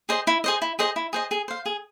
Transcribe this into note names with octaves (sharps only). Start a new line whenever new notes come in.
G#4 C5 D#5
E4
G#4 C5 D#5
E4
G#4 C5 D#5
E4
G#4 C5 D#5
G#4
C5 F5
G#4